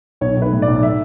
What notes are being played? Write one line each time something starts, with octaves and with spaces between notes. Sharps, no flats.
B1 C#5
B1
B4
A2
D5
B1
E5